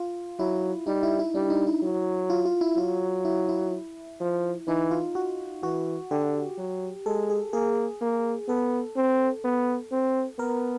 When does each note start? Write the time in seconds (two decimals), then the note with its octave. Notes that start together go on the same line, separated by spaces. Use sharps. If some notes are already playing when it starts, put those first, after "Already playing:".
Already playing: F4
0.39 F#3 E4
0.87 G3 D#4
1.03 E4
1.19 E4
1.35 G3 D4
1.50 D#4
1.67 E4
1.82 F#3
2.30 F4
2.45 F4
2.61 E4
2.77 F#3 F4
3.25 E4
3.49 E4
4.20 F3
4.67 E3 D#4
4.91 F4
5.15 F#4
5.63 E3 F#4
6.11 D3 G4
6.58 F#3
7.06 G#3 A4
7.30 G#4
7.53 A#3 G#4
8.01 A#3
8.48 B3 A4
8.96 C4
9.44 B3
9.92 C4
10.39 B3 A#4